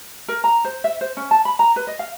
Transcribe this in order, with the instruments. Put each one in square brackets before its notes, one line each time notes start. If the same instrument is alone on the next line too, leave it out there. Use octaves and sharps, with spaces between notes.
[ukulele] A#4
A#5
C5
E5
C5
C#4
A5
B5
A#5
B4
D#5
F5